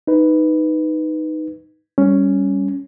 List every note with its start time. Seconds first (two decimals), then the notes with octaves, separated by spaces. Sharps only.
0.07 D#4 B4
1.98 G3 C#4